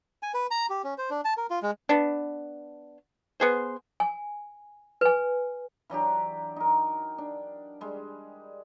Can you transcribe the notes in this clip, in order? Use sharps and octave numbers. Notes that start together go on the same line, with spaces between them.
G#5
B4
A#5
G4
C#4
C5
D4
A5
A#4
F4
G#3
B3 D4
B3 G#4 C5
G#5
B4 G#5
E3 F#3 D4 G4
D#4 A#4
D4
G3 G#3